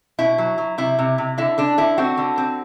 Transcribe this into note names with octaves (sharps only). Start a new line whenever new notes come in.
B2 E4
F#3
F#3
C3 E4
C3
C3
D3 E4
D3 D4
D3 E4
C4 F#4
D3
C4